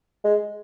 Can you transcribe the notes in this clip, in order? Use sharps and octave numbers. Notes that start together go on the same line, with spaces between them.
G#3